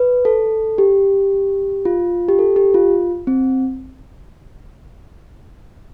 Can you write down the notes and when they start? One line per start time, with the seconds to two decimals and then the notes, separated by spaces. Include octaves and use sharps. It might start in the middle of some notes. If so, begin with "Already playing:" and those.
Already playing: B4
0.25 A4
0.78 G4
1.85 F4
2.29 G4
2.39 A4
2.56 G4
2.74 F4
3.27 C4